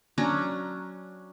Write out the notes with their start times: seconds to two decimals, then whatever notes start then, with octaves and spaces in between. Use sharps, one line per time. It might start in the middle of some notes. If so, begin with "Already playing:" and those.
0.18 F#3 C#4 D4 A#5